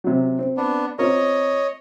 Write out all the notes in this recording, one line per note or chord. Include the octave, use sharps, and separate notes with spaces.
C3 F#3
C4
B3 D4
C4 F4 A#4 C#5 D#5